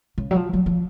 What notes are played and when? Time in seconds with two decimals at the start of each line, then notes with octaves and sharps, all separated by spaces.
0.18 C#3
0.31 F#3
0.36 F3
0.53 F#3
0.66 F3